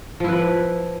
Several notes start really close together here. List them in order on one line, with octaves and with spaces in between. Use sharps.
F3 E4 B4